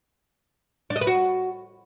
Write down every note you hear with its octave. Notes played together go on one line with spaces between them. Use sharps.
D4
D#5
B4
F#4